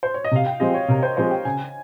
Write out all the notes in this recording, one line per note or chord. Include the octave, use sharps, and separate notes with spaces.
C5
C#5
D#5
C3 F5
G5
F3 G#3 C4 G4 D#5
C#5
C3 A#4
C5
F3 G#3 C4 G4 C5
G5
C#3 G#5